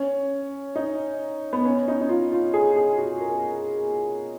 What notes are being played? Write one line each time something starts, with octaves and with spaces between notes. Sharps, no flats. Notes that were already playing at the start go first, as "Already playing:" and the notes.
Already playing: C#4
D#4
B3
C#4
D#4
D#4
F4
F4
G#4
G#4
F#4
A#4